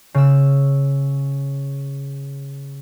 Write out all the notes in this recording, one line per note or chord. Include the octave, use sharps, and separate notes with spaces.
C#3 E6